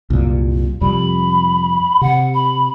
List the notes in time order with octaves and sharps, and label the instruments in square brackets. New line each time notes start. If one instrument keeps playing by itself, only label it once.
[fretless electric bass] C2 F#2 A#2
[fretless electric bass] F2 C3 G3 [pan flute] B5
[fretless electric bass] C3 [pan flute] F#5
[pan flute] B5